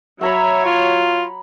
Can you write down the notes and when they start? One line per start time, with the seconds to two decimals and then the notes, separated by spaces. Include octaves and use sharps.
0.21 F#3 C#5 E5 F#5 A#5 B5
0.65 F4